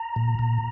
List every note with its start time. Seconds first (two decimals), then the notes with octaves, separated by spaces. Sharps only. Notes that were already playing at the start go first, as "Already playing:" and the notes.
Already playing: A#5
0.16 A#2
0.39 A#2